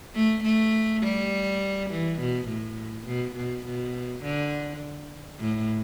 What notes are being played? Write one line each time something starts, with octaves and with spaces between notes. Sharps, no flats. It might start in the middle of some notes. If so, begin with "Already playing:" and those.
A3
A3
G3
E3
B2
A2
B2
B2
B2
D3
A2